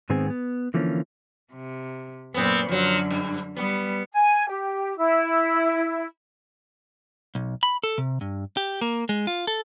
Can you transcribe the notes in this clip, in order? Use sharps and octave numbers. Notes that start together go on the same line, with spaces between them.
G#2 D#3 B3 C4 G#4
B3
D3 E3 F3 A#3 C#4
C3
F#2 A#2 B3 C4
F#2 D3 F3 F#3
G2
G3 B3
G#5
G4
E4
B1
B5
A4
C3
G2
G4
A#3
G#3
F4
A4